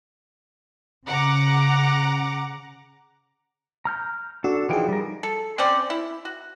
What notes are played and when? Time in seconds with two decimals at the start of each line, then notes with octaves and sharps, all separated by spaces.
1.06 C#3 F#5 A#5 D6
3.85 A#5 F6 G6
4.44 D4 F#4 A4
4.69 E3 F3 D#4 G#4 G5
4.88 G3 A#4
5.23 A4
5.58 C4 C#4 C5 D5
5.90 E4
6.25 F#4